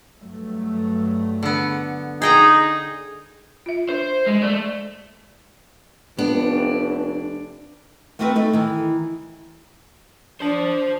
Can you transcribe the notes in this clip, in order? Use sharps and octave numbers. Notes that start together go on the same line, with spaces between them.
G2 F#3 A3
D3 B3
D#4 G#4 G5 A#5
F4 E5
D4 C5
G#3
G#3 A3 D5
F1 B3 D4
A3 B3 C4 F#4 A#4 B4
A3 D#4 A4
D#3 E3
D4 C5 A5